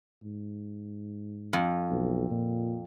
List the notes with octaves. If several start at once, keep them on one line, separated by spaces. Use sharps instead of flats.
G#2
F2
B1
A#2